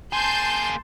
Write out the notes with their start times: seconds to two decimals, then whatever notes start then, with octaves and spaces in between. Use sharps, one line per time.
0.13 A#3 G#4 A5 C6 G6